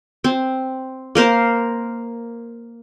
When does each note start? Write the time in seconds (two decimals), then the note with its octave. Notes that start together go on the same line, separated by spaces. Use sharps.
0.24 C4
1.15 A#3 A#4 C5 F5